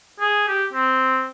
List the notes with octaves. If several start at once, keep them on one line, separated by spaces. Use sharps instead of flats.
G#4
G4
C4